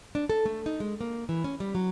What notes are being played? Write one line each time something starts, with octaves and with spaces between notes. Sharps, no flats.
D4
A4
A3
D#4
G#3
A#3
E3
C#4
G3
F#3